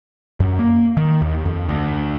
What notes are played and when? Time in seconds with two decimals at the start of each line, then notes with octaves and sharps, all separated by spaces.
0.40 F#2
0.59 A#3
0.97 D#3
1.21 D#2
1.45 F2
1.69 D2